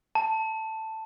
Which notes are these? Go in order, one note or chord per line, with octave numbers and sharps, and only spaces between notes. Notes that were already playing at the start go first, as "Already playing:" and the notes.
A5